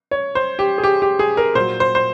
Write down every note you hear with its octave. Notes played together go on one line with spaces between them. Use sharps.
C#5
C5
G4
G#4
G4
G4
G#4
A#4
A#2 F#3 C5
C5
C5